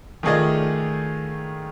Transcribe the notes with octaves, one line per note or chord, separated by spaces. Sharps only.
D#3 A3 F4 G#4 D5 D#5